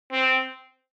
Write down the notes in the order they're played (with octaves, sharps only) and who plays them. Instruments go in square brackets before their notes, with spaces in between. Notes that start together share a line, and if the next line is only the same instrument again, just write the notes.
[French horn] C4